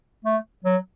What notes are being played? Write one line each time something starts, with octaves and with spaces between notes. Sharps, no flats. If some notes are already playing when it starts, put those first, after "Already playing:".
A3
F#3